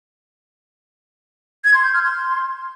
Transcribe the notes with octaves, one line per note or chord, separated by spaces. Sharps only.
G#6
C6
G6
F6
C6